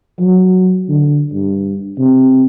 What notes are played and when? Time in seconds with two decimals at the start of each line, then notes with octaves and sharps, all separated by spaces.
0.20 F#3
0.89 D3
1.33 G2
1.98 C3